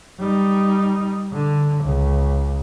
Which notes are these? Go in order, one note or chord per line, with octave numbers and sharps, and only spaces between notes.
G3 D#4
D3
C#2